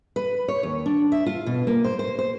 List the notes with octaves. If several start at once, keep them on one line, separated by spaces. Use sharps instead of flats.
B4
C#5
D#2
D4
E5
F4
B2
A#3
C5
C5
C5